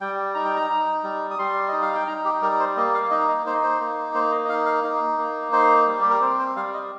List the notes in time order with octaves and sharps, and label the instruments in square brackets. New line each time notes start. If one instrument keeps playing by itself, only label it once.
[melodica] G3 G5
D#4 A#5
G5
A#5
D#4
G3
D#6
G3 C6
D#4 D#5
F5
G5
D#4 A#5
G4
G3 A#4
C5
A#3 D#5
F5
D#4 D#5
D#5
D#4 C5
D#5
C5
A#3
A#3 C5
D#5
D#5
D#4 F5
F5
D#4
A#3
D#4 C5
G3
G4
A#4
C4 C5
C5
G3 F5
D#5